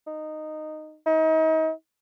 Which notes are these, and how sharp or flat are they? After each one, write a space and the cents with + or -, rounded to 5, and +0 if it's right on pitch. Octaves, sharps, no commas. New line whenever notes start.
D#4 -10
D#4 +35